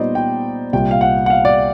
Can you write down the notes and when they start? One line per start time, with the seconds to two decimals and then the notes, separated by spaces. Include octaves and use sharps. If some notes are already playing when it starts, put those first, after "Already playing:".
Already playing: A#2 G3 B3 D#4 C5 D5 D#5
0.15 G5
0.73 C2 A#2 G3 G5
0.91 F5
1.01 F#5
1.26 F#5
1.30 F5
1.45 D5